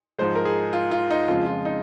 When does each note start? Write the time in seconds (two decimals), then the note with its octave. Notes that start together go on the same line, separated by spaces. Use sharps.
0.19 G#2 F3 G#3 C5
0.35 A#4
0.45 G#4
0.73 F4
0.91 F4
1.11 D#4
1.28 F2 C#3 F3 G#3 F4
1.46 F4
1.65 D#4